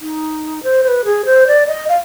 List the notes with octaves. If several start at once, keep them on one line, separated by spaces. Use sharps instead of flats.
D#4
C5
C5
B4
G#4
C5
D5
D#5
F5